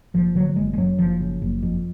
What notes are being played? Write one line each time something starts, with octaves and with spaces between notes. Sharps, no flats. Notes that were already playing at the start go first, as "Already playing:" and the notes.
F#1 F3
D3 F#3
F#3
F#1 G#3
G#3
F#2 F#3
F#1 F3
C#3
F#1
F2